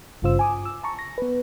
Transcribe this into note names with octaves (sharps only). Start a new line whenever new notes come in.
G#1 G2 C#3 F4 C5 E6
G#5 D6 D#6
E6
A5 A#5 C#6
A#6
B3 B4